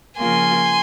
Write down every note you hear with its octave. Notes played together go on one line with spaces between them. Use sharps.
C#3 F3 A#3 F4 G#5 C6